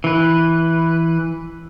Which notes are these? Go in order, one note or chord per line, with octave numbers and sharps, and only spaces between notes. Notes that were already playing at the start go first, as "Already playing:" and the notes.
E3 B4